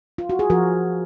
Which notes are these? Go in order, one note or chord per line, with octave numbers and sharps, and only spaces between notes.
F4
F#4
G#4
F3 F#4 A#4